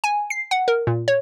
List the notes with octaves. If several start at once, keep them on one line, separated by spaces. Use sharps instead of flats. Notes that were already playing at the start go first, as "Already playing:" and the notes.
G#5
C7
F#5
A#4
A#2
C#5